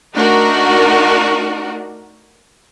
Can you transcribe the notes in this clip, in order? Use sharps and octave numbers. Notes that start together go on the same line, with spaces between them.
A3 D4 D#4 F#4 A#4